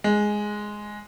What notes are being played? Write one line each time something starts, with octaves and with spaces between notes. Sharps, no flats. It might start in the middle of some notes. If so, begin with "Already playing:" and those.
G#3